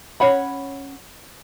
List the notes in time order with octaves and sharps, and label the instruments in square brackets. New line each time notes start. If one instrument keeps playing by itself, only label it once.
[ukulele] C#4 C#5 F#5 B5